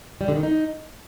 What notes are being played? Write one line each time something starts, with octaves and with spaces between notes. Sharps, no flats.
G3
D3
D#3
D#4